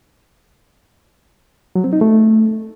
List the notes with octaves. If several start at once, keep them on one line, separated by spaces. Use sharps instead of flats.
F#3
C4
D#4
A3